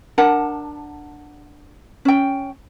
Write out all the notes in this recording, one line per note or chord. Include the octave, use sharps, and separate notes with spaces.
D4 A#4 F#5 A5
C#4 G5